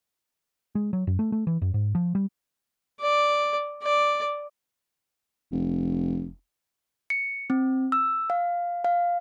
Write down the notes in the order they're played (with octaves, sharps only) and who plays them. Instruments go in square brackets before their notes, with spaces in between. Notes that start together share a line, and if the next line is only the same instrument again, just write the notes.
[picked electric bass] G#3
F#3
F#2
A3
A3
E3
F#2
G#2
F3
G3
[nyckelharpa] D5
D5
[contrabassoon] F1
[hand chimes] C#7
C4
E6
F5
F5